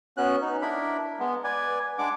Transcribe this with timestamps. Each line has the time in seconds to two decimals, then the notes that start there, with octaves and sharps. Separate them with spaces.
0.17 B3 C#4 F#4 F#6
0.41 D#4
0.62 D4 E4 A#4 B5
1.19 G#3 B3
1.44 B4 D5 G#5
1.98 G#3 D4 F#5 D6